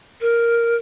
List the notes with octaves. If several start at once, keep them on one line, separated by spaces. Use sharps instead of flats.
A#4